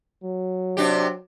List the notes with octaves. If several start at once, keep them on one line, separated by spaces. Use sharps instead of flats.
F#3
C3 D4 G4